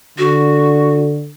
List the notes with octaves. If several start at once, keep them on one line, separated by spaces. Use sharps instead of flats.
D3 F#4